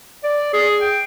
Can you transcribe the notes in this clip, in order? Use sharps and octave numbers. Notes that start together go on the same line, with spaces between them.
D5
G#4
G5